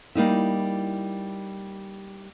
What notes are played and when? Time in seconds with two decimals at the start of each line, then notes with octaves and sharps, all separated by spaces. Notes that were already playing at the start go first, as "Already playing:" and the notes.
0.15 G3 A#3 D#4 E4